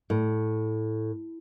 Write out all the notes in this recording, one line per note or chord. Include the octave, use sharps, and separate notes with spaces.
A2